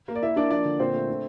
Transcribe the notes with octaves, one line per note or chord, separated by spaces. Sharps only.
A#3
D5
A#3 E4 E5
A#3 D4 D5
F3 D4 D5
D3
A#2 C4 C5
A3
D4